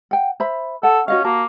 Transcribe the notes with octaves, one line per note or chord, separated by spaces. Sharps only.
F#5 G5
C5 E5 B5
A4 F#5
C#4 F#4 D#5 F5
A#3 F#4 A5